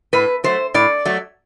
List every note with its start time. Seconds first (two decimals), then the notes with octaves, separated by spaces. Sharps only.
0.13 A2 B4
0.44 F#3 A3 C5
0.74 A2 D5
1.05 F#3 A3